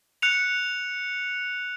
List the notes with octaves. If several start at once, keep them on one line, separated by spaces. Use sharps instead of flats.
F#6 C#7 F7